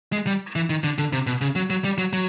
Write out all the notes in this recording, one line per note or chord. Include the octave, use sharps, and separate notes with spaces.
G#3
G3
E3
D#3
D3
D3
C3
B2
C#3
F#3
F#3
G3
F#3
F#3